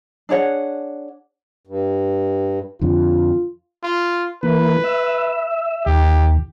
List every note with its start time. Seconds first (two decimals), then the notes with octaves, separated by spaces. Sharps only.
0.29 D4 G#4 C#5 F#5
1.67 G2
2.81 F2 D3 F4
3.83 F4
4.43 E3 A#3 B4
4.84 E5
5.86 D#2 G4